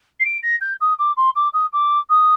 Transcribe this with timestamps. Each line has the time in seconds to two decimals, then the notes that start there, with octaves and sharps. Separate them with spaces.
0.20 C7
0.25 D7
0.43 A#6
0.61 G6
0.81 D#6
0.99 D6
1.17 C6
1.35 D6
1.53 D#6
1.73 D6
2.09 D#6